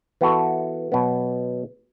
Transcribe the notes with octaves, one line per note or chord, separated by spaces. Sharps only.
E3 B3 F#4 A4
B2 F#3 B3